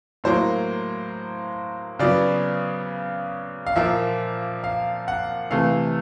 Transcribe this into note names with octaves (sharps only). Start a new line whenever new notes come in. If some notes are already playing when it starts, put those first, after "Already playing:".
A2 F#3 A#3 C5
C#3 F#3 B3 D5
F5
A#2 F3 A#3 E5
F5
F#5
C3 E3 A3 F5